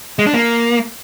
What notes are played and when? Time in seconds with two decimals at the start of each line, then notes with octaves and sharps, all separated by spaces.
0.19 G#3
0.26 D4
0.34 A#3